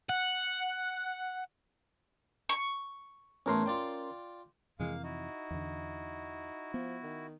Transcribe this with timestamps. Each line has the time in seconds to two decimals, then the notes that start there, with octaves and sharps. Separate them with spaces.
0.09 F#5
2.49 C#6
3.46 E2 A2 A3 C#4 A#4 C6
3.66 F4 D5 G5
4.79 F2 C3 E3 G#3 A#3 F5
5.04 D#4 E4 F#4
5.51 E2 D3
6.74 F3 B3
7.03 D#3